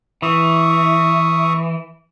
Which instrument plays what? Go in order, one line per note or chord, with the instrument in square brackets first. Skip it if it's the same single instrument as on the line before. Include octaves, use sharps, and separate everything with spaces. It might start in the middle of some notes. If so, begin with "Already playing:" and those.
[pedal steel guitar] E3 [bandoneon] E5 C#6 D#6